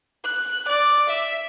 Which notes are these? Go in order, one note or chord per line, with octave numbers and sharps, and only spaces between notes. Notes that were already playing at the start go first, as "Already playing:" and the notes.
F#6
D5
E5